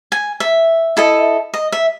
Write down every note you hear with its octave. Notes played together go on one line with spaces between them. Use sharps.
G#5
E5
E4 A4 D#5
D#5
E5